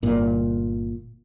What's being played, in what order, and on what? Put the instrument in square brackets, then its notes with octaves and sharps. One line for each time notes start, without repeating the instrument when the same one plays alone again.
[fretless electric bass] G1 A#2